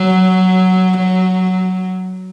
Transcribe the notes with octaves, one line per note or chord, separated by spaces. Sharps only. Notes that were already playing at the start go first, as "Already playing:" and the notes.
Already playing: F#3